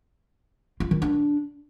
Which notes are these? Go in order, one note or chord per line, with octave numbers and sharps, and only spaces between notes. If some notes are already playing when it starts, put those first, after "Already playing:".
F4
D#3
D4